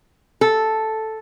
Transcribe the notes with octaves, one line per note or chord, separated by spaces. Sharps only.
A4